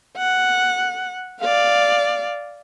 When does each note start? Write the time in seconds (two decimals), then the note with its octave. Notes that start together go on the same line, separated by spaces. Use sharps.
0.18 F#5
1.40 D5 F5